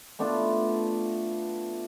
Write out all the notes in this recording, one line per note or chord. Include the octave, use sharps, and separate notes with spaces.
A3 B3 D4 F4